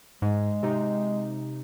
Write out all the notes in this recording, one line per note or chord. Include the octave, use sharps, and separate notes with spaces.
G#2 G#3
C3 D#4